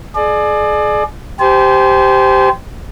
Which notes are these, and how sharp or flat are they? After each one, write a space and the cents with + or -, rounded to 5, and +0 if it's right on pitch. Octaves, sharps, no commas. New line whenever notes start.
G#4 +35 D5 +30
G4 +0 C5 -15 G#5 +40